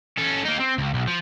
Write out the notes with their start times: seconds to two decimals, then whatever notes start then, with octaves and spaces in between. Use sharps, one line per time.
0.18 C#4 A4
0.45 A#3 D#4
0.60 C4
0.78 C#2
0.94 B1
1.07 F3